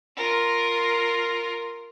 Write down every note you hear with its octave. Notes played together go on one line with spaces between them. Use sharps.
F4 A#4